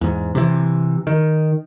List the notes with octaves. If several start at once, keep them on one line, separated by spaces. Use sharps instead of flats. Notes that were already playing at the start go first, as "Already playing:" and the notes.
E2 G#2
C3 E3
D#3